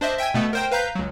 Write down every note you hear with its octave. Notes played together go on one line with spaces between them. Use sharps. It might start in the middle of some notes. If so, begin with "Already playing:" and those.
D4 C5 D#5 E5
E5 G5 G#5 G#6
B2 A3 B3
A#4 C5 G5
B4 F5 A#5 G6 B6
C#2 F#3